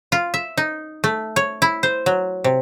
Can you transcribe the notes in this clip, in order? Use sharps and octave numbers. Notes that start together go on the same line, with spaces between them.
F4
E5
D#4
A3
C#5
E4
C5
F#3
C3